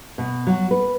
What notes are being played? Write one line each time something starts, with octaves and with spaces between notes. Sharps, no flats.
B2
F#3
B4